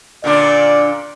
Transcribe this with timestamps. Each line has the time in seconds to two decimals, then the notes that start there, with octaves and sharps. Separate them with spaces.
0.24 A#2 D3 D4 D5